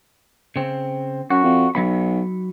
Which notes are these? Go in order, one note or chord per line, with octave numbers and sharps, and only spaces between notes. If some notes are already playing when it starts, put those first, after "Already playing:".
C#3 C4
F#2 F#4
F2
B1 F#3 D#4 B5